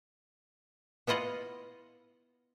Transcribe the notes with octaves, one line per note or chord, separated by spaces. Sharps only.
B3 E4 F4 D#5 F#5